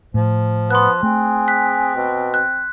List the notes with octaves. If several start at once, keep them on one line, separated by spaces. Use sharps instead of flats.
A2 F3
B3 C6 F#6
A3 C4 G#4
F#6 B6
B2
F#6